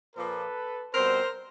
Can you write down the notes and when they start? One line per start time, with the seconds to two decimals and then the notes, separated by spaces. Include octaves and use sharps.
0.16 A#2 F3 A#3 A4 B4
0.94 B2 G3 C4 A#4 C5